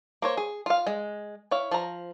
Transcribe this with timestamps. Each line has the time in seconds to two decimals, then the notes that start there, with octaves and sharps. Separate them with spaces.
0.22 A#3 C5 C#5
0.37 G#4
0.66 F4 F5
0.87 G#3
1.51 E4 C#5 F5
1.71 F3 A#5